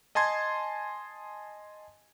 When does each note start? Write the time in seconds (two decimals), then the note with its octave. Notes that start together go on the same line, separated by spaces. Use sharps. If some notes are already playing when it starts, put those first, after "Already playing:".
0.15 D#5 G#5 A5 C6 G#6